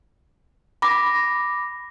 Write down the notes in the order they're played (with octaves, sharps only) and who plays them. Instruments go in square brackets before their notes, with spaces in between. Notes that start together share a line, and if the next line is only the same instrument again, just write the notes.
[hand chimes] B5 D6 A#6